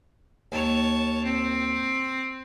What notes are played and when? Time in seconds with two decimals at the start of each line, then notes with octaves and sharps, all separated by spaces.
0.52 D#2 C#5 A5
1.24 C4